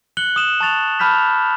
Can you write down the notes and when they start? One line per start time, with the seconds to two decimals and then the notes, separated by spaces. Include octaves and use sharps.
0.17 F#6 C#7 F#7 G7
0.36 D#6 E7 F#7
0.60 A5 C#6 A6 F7
1.00 A5 B5 F6 G6 B6